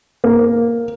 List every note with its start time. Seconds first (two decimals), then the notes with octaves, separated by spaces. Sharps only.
0.24 A#3